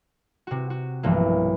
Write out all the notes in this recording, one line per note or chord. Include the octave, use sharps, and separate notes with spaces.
C3 F#4
F#4
B1 G2 E3 F3 A3 A#3